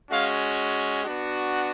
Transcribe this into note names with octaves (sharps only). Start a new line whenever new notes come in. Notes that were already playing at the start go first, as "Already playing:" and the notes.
G#3 C#4 F#4 F5
B3 D4 F#4